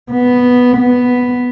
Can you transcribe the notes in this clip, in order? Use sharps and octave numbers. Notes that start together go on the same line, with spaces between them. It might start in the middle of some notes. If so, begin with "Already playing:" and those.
B3
B3